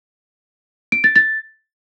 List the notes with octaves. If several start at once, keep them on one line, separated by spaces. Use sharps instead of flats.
D7
A6
A6